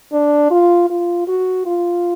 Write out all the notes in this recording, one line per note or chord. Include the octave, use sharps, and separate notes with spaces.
D4
F4
F4
F#4
F4